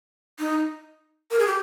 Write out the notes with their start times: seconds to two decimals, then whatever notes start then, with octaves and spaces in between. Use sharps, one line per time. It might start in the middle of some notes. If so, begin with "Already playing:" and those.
0.39 D#4
1.31 A#4
1.39 G#4
1.47 G4